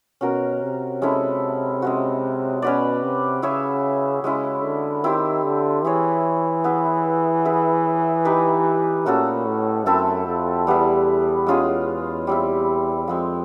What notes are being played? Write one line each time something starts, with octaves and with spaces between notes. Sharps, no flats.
B2 C#4 F#4 A#4
C3
G#3 C#4 E4 A4
G#3 C#4 F#4
B2 C#4 F#4 B4 D5
C3
C#3 E4 G#4 C#5 E5
C#3 G#3 C#4 E4
D3
D#3 C4 E4 G4 C5
D3
E3 E4 G#4 C#5
B3 E4 G#4
E4 G#4 B4
D#4 G4 B4 E5
A#2 A3 C#4 F#4 A4
A2
F#2 A3 C4 E4 A4
F2
E2 G3 B3 E4
G#3 C#4 F4 G#4
G3 C4 E4
F2 F3 G#3 C4